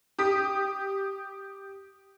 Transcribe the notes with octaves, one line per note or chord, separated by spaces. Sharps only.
G4 D#6 B6